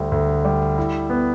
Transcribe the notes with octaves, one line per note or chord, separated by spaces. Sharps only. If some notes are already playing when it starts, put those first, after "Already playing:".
Already playing: D2 G3
D2
G3
E4
B3